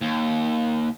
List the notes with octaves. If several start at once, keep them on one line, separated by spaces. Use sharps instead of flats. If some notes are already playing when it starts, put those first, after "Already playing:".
D#2